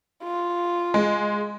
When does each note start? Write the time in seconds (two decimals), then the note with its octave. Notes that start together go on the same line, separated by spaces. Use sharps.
0.24 F4
0.94 G#3